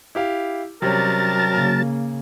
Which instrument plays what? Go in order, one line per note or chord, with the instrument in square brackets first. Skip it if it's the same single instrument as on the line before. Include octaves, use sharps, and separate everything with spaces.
[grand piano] E4 G4 F5
[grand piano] C3 G3 C#4 [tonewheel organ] F#3 A5 A6 [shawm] A#4
[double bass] C#3 A#3